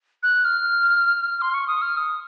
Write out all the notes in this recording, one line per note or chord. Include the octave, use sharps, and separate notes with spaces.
F#6
F6
C6
C#6
D#6
F6
D#6